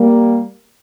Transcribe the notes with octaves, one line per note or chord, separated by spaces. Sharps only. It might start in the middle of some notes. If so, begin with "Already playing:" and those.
Already playing: G3 A#3